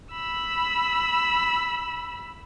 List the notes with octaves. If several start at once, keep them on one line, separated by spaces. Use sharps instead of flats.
B5 E6